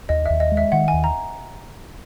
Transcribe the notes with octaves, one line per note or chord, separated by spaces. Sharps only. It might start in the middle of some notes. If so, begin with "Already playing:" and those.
D#2 D#5
D#2 E5
D#5
G#3
E5
D#3 F#5
G#5
D#2
A#5